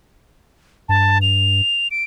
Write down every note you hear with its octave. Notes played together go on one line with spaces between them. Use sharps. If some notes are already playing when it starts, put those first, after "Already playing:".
G2 A5
F7
D7